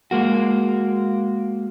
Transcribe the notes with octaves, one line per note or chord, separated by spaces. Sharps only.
G#3 A#3 F#4